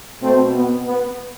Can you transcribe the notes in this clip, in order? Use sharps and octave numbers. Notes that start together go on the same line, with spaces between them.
B2 A3 C4
B3
B3